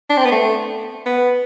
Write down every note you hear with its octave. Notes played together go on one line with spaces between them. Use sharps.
D4
C4
B3
A3
B3